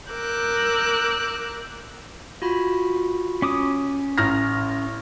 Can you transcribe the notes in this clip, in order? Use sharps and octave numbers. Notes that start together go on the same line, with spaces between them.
A#4 D6 E6 F#6 G6
F4 F#4 B5
C#4 D6 D#6
A1 A#5 F6 A#6